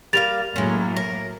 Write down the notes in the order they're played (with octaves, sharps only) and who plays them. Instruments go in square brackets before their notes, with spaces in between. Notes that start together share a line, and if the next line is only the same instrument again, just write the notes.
[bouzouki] G3 A#3 F5 [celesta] A6 F7
[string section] A2 F#3 A#3 [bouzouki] G#3 C#4
[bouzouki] A#4